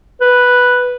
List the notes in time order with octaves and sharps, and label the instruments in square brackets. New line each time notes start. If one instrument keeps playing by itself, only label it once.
[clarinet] B4